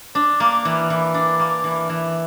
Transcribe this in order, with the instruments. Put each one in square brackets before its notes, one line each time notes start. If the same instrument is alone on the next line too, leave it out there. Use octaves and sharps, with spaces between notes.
[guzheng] D4
A#3
E3
E3
D4
A#3
E3
E3